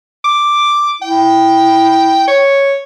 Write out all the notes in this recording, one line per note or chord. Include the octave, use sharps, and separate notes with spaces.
D6
E4 G5
C#5